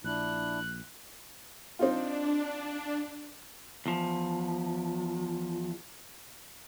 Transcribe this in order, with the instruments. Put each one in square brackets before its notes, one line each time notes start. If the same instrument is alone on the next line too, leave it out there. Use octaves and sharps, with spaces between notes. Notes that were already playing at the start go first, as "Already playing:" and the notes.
[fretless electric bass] A#1 [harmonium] D4 E4 [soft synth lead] F#6
[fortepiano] C4 D#4 F4 [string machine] D4
[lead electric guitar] E2 F3